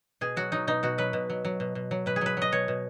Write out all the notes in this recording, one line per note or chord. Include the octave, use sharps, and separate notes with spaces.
B2 G#4
F#3 F#4
F#3 D#4
B2 D#4
B2 F#4
F#3 B4
B2
F#3
F#3
B2
B2
F#3
B2 B4
G#4
F#3 B4
F#3 D#5
B2 C#5
B2